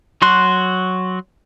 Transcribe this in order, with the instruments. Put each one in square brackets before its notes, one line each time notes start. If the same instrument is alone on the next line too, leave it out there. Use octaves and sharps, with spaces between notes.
[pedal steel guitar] F#3 F#4 C6 F#6